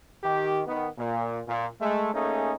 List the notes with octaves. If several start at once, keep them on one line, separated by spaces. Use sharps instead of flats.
D#3 G4
D#3 B3
A#2
A#2
G#3 A3
A3 A#3 C#4 D#4 G#4